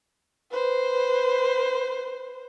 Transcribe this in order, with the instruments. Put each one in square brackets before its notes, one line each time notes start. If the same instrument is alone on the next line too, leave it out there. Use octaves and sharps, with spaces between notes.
[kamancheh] B4 C5